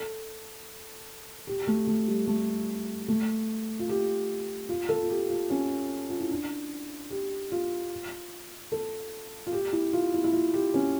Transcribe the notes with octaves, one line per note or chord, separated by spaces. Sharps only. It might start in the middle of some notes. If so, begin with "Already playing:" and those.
Already playing: A4
G4
A3
A3
G3
A3
A3
F4
G4
F4
A4
F4
G4
F4
C#4
F4
E4
D4
G4
F4
A4
F4
G4
E4
F4
E4
E4
F4
G4
C#4